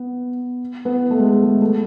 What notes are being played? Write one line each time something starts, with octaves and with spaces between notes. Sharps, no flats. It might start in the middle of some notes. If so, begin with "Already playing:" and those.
Already playing: B3
B3
A3
G#3
A3
G#3
A3